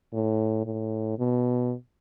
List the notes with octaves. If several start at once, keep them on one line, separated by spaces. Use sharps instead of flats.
A2
A2
B2